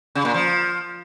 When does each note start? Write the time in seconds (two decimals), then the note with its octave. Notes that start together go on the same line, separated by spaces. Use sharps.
0.15 C#3
0.25 A#2
0.34 F3